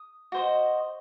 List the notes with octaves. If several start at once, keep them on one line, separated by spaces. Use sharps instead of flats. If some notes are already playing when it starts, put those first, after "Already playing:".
Already playing: D#6
F#4 C5 D#5